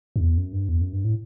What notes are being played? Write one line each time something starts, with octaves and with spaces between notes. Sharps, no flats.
F#2
E2
F#2
G2
E2
F#2
G2
A2